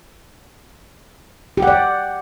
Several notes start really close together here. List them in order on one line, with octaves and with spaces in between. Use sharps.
G4 F#5 D5